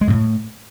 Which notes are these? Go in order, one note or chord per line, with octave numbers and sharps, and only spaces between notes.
G#3
F#2
A2